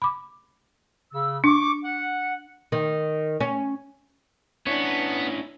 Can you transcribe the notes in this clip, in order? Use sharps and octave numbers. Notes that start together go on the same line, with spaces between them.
B5 D6
C#3 E6
D4 C#6 D6
F#5
D#3
C#4
B3 C#4 D4 E4 C#5